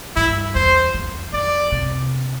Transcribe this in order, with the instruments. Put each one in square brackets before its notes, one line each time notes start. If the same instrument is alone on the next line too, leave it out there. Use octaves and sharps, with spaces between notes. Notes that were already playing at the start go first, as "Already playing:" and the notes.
[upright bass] G2 [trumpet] E4
[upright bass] E2 [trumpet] C5
[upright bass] F2
[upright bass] F2 [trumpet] D5
[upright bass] C3